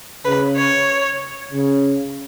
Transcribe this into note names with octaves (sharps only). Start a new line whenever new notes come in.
C#3 B4
C#5
C#3